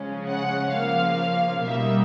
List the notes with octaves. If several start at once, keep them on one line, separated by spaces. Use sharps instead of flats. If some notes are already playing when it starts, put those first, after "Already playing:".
Already playing: C#3 F3 G#3 C#4
F#5
C#3 F3 A#3 F5
B2 G3 A#3 D#4 E5